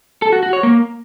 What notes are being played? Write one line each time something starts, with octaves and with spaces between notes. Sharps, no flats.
A4
F#4
F#4
C#5
A#3